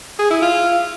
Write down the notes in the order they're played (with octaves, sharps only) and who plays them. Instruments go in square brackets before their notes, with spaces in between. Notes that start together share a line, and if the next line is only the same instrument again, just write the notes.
[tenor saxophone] G#4
E4
F4